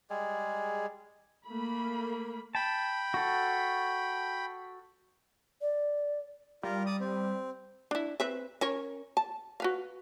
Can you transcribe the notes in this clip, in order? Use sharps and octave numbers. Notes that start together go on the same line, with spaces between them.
G3 G#3 G#4
A3 A#3 B5
G5 A5 B5
F#4 A4
D5
G3 F4 A#4
D5 D#6
C4
D4 E4
C4 B4 E5
C#4 A#4 C#5
A5
F#4 B4 F5